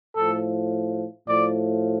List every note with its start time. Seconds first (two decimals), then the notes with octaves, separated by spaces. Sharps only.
0.16 A2 F3 A4
1.27 A2 F3 D5